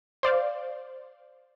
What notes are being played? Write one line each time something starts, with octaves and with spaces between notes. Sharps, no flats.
C5 D5 F5